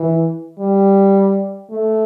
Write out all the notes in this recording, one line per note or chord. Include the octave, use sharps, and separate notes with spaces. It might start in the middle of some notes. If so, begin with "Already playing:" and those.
Already playing: E3
G3
A3